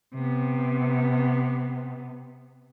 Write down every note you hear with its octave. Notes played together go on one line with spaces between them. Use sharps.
C3 B3